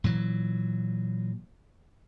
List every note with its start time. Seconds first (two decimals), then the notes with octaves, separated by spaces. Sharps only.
0.04 A#2 E3 F#3